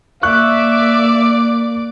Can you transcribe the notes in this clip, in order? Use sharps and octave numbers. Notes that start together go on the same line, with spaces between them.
A#3 D5 E5 C#6 D6 F#6